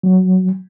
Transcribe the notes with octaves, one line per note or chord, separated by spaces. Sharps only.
F#3